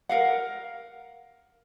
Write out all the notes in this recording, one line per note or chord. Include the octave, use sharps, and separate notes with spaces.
A#4 F5 F#5